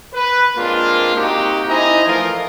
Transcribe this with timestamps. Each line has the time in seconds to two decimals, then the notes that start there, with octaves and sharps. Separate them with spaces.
0.14 B4
0.58 G#3 A#3 C4 D4 F4
1.15 A#3 C4 D#4 F#4 G4
1.68 D#4 E4 C5 D#5 G#5 A#5
2.07 E3 F3 A3 F4 A#4